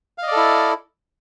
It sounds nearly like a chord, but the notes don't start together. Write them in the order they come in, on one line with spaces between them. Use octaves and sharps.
F5 D#5 D5 A4 E4